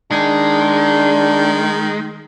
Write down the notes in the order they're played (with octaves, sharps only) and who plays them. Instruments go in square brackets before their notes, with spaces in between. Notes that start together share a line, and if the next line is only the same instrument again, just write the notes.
[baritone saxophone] D#3 [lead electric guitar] G#3 [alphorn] D4